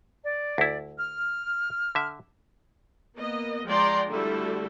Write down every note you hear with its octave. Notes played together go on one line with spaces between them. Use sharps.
D5
D2 E4
F6
D3 E5
A#3 B3 D#5
F3 G#3 D5 G5 A#5 C6
D3 G3 A3 E4 F#4 A4